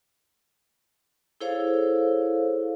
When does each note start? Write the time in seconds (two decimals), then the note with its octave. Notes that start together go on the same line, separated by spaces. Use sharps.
1.41 E4 G#4 A4 C5 C#5 F5